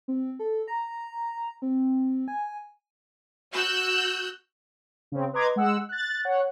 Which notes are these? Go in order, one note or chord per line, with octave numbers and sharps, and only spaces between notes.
C4
A4
A#5
C4
G#5
F#4 E6 F#6 G6
C#3 C4
B4 D#5 A#5 C6 D6 G#6
G#3 F#5 E6
F#6 A6
C#5 F#5